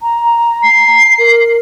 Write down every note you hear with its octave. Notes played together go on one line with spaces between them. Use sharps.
A#5
C7
A#4